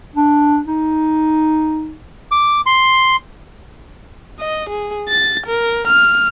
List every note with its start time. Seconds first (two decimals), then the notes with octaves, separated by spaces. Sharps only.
0.16 D4
0.67 D#4
2.31 D6
2.66 C6
4.39 D#5
4.70 G#4
5.09 A6
5.47 A#4
5.88 F6